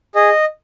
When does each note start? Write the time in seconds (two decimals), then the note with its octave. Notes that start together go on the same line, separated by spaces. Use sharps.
0.15 G#4 D#5